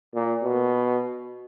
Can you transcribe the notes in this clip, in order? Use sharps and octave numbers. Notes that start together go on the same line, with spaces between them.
A#2
B2